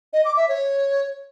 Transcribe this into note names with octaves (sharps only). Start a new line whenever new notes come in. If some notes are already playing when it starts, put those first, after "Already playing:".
D#5
D6
E5
C#5